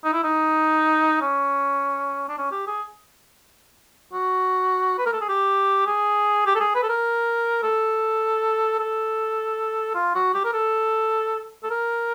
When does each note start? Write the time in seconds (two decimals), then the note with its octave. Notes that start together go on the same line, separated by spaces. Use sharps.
0.04 D#4
0.13 E4
0.23 D#4
1.22 C#4
2.29 D4
2.38 C#4
2.52 G4
2.67 G#4
4.13 F#4
4.98 B4
5.06 A#4
5.13 A4
5.21 G#4
5.29 G4
5.87 G#4
6.46 G4
6.55 A4
6.60 G#4
6.75 B4
6.83 A4
6.89 A#4
7.63 A4
8.79 A4
9.95 F4
10.15 F#4
10.34 G4
10.45 A#4
10.53 A4
11.63 A4
11.70 A#4